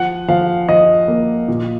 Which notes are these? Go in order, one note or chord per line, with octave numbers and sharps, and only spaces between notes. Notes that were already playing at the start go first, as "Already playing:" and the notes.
Already playing: F3 F#5
F3 F5
F3 D#5
A#3
A#2